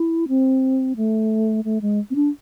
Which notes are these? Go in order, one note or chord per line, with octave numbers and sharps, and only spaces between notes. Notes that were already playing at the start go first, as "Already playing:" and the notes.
Already playing: E4
C4
A3
A3
G#3
C4
D4